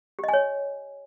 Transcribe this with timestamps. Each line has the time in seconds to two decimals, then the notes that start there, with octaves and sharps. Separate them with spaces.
0.19 G4
0.24 D#5
0.29 G#5
0.33 C#5